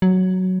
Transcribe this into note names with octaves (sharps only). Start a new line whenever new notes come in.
F#3